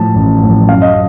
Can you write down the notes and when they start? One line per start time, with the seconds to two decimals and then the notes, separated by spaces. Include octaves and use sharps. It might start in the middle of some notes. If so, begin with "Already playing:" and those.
Already playing: A2 F3 A5
0.15 A1
0.42 A2 F3
0.67 F#2 F5
0.82 D#5